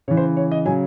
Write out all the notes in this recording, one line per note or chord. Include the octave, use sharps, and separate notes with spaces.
C#3 E3 C#5
C5
C#5
D#5
C#3 F#3 G#5